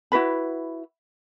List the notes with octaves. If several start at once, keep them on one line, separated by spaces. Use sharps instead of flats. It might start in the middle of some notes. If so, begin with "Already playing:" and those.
E4 F#4 B4 B5